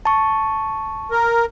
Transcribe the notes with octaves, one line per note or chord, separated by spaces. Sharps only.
A5 C#6
A#4